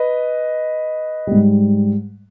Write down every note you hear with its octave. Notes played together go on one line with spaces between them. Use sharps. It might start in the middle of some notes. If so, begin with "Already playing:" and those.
Already playing: B4 D#5
G#2 G3